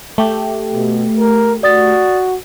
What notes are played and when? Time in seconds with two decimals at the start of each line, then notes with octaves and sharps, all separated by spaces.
0.18 A3 G4
0.74 B2
1.17 A#4
1.63 F#4 D5 D#6 A6